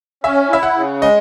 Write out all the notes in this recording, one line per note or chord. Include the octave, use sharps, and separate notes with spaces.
C#4 E5
E4 E5
F#5
C#3
G#3 D#5